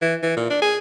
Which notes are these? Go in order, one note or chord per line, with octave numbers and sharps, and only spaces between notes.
E3
E3
A#2
D4
G#4